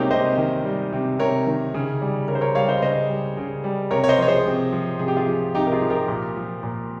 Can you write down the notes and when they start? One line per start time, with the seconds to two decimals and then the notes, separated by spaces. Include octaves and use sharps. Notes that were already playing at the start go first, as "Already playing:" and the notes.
Already playing: C3 G3 G#3 A#3 C4 C#4 D#4 G4
0.11 C3 C5 D#5
0.38 D#3
0.65 G3
0.93 C3
1.19 C3 A#4 C#5
1.47 D#3
1.74 C#3
2.02 G3
2.28 C#3 A#4 C#5
2.35 C5
2.41 A#4 C#5
2.55 G3 C#5 F5
2.69 C5 D#5
2.82 C#3 C5 D#5
3.09 G3
3.37 C#3
3.64 G3
3.91 C3 A#4 C#5
4.04 C#5
4.09 C5 D#5
4.18 F3 C#5
4.28 G#4 C5
4.46 C3
4.72 F3
4.99 C3 G#4
5.08 G4
5.17 F4 G#4
5.27 F3
5.54 C3 D#4 G4
5.67 A#4
5.72 F4 G#4
5.81 F3
5.90 G4 A#4
6.08 A#2
6.36 F3
6.63 A#2